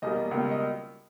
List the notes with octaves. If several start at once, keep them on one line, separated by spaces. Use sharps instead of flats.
E2 B2 G3 A#3 D#5
C#2 B2 G3 A#3
D#5